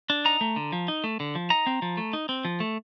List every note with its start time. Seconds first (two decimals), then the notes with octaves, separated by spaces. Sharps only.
0.10 D4
0.25 D#4 A#5
0.41 A3
0.56 D3
0.72 F3
0.88 D#4
1.04 A3
1.20 D3
1.35 F3
1.50 D#4 A#5
1.67 C4
1.82 F3
1.97 A3
2.13 D#4
2.29 C4
2.45 F3
2.60 A3